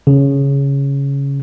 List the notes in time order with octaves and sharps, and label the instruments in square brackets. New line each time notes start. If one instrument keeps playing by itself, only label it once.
[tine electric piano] C#3